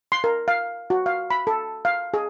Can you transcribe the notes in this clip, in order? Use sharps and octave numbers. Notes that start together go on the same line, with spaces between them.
C6
A#4
F5
F#4
F5
B5
A4
F5
G#4